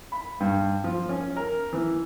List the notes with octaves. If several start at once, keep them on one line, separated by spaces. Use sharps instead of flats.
B5
G2
F3
C#4
A#4
E3